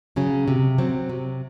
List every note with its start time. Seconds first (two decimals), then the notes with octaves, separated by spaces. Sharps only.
0.16 C#3 F#3 C#4
0.48 C3
0.78 F#3 C4
1.10 C3